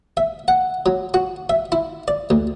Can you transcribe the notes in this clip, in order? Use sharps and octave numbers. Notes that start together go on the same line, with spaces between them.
E5
F#5
F#3
F#4
E5
E4
D5
D2